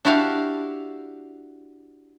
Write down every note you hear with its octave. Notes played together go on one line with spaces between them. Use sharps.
D4 E4 F#4 G4 F5